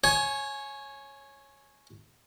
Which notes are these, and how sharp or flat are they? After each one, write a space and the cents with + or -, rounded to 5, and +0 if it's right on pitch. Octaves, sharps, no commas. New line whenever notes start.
C#5 -15 G#5 +15